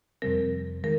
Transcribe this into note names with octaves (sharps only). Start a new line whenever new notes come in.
F2 C3 G3 C4 A#4
D#3 G#3 A#4